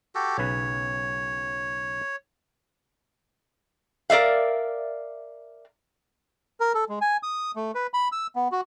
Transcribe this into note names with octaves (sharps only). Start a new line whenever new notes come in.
F#4 G4 A4
B1 C#3 B4 C#5
A#4 D5 E5 F5
A#4
A4
G#3
G#5
D#6
A3
B4
B5
E6
B3
F#4